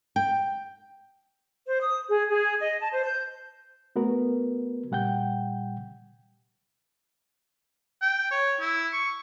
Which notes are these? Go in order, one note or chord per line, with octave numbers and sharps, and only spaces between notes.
G5
C5
D#6
G#4
G#4
D#5
A5
C5
G6
A3 B3 F#4 A#4 B4
A#2 G3 F#5 G5 G6
G5
C#5
E4
C#6